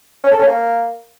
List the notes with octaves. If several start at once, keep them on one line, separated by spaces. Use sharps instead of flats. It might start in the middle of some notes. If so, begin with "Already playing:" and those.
C#4
A4
C#4
A#3